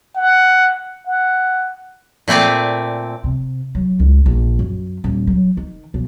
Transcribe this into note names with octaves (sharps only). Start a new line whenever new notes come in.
F#5
F#5
A#2 A3 C4 D5 G#5
C3
F#3
C#2
A#1
F#2
D#1
F#3
D#3
B1